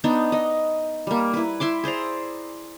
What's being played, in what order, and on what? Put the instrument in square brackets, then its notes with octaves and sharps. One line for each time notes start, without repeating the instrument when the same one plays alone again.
[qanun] B3 D4 D#4
D#4 D#5
G3 A#3
E4 B4
E4 E5 C6 D6
G#4 C5 D5 A#5